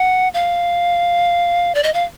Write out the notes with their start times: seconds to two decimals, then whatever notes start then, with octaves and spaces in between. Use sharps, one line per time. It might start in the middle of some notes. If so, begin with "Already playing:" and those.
Already playing: F#5
0.34 F5
1.75 D5
1.83 D#5
1.94 F5